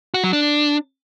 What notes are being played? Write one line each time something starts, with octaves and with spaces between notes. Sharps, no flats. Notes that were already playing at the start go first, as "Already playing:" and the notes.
F#4
F#3
D4